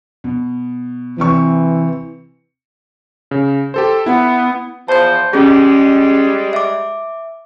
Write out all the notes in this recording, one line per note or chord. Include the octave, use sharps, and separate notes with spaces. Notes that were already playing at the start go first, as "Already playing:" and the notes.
B2
C3 E3 C4 C#6
C#3
G4 A4 C5
B3 E4
E2 F3 C5 A5 G6
G3 G#3 C#4 G#4
E5 D6